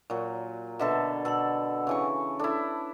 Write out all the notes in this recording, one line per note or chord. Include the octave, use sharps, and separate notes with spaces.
A#2 F#3
B2 D3 A4 B4 E5
B2 A4 F#5 E6
C#3 E3 C#6
D4 E4 A4